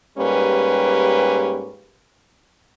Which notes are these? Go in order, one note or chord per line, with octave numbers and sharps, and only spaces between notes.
G#2 G3 A#3 C#4 G4 B4